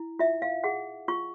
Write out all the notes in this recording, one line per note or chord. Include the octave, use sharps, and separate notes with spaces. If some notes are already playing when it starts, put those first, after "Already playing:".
Already playing: E4
F4 E5
F5
G#4 F#5
F4 C#6